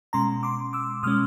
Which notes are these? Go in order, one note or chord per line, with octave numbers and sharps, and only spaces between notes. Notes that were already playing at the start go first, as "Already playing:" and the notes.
B2 G#3 C#4 A#5 C6
C6 D6
D6 E6
B2 G#3 C#4 D#6 F6